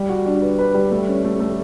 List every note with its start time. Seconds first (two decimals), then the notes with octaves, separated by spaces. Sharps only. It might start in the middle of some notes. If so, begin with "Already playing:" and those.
Already playing: G3
0.09 F#4
0.26 D4
0.42 B4
0.59 B4
0.74 G3
0.91 A3
1.07 C#4
1.24 A3
1.40 A3